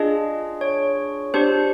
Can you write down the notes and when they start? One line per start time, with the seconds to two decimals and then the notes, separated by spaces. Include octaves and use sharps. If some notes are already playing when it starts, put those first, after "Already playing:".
Already playing: D4 F4 G#4 D#5
0.61 C#5
1.34 D4 G4 C5